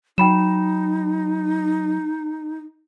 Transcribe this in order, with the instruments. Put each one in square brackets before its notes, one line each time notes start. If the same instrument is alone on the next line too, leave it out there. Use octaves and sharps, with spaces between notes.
[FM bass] F#3 [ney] D#4 [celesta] G5 B5 E7